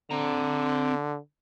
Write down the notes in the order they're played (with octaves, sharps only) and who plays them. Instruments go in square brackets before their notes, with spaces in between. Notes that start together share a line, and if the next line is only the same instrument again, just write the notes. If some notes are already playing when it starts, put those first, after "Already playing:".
[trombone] D3 [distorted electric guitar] C4 A#5